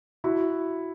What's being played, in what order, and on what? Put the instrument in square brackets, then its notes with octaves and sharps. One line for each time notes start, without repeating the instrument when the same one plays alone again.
[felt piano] E4 F#4